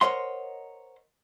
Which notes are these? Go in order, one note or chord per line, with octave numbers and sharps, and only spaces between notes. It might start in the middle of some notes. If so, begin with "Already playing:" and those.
A#4 C5 C#5 D#5 F#5 C6